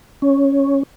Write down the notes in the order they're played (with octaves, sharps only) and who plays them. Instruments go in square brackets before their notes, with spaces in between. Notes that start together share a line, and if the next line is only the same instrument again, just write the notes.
[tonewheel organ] C#4